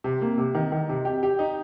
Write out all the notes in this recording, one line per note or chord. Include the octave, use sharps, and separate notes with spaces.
C3
A#3
C3
D#3
D#3
C3
G4
G4
D#4